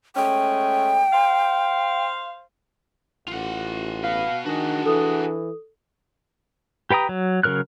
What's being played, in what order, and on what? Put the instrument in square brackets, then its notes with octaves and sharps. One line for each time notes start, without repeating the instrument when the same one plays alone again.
[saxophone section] G#3 A3 C#4 [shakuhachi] G5
[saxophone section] C5 F5
[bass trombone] A1 [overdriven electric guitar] F4 F#5
[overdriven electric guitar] F#4 B4 [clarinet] F5
[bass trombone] D#3 [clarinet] D4 [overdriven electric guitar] F#4 G#4
[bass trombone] E3 [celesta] A4 D#6
[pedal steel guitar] G4 B4 G5 A#5 D#6
F#3
C#3 F#3 A#4 F6 F#6